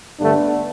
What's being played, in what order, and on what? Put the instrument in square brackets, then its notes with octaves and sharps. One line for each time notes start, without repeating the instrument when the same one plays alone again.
[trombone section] G2 D3 A3 B3 D4